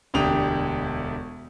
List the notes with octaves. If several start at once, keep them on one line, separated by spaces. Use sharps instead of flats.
E1 D2 D4 G4 D#6 F7